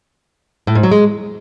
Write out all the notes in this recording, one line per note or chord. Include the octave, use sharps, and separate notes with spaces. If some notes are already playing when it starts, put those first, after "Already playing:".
A2
G#2
F#3
G#3